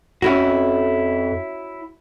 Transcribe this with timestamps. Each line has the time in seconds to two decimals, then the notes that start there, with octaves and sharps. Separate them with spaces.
0.22 F2 C#4 E4 F#4